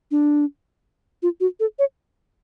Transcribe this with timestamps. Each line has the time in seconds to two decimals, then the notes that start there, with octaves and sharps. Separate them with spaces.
0.11 D4
1.22 F4
1.40 F#4
1.60 A4
1.79 C#5